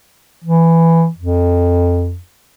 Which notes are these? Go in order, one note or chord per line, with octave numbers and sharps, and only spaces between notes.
E3
F2